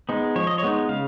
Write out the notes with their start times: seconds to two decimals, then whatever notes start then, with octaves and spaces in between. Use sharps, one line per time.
0.09 G#3 B3 D#4
0.36 F3 C#5
0.47 D#5
0.58 C#5
0.63 G#3 B3 D#4
0.89 C#3 F5